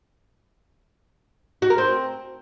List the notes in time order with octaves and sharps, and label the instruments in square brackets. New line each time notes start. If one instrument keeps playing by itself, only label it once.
[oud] F#4
A#4
C4